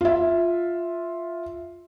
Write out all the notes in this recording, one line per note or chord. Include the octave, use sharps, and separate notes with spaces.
F4 E5